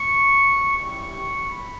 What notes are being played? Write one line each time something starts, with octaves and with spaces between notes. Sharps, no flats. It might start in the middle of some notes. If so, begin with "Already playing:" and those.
Already playing: C#6
G3 C#4 E4 G4 C#6
B5